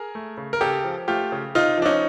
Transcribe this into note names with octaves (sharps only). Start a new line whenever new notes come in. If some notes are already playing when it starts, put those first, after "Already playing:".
Already playing: G#4 A#4
A3
C#3
A#4
C#3 G4 A4
F3
A3 F4 G4
C#3
C3 D#4 F4
F3 D4
C#4 D#4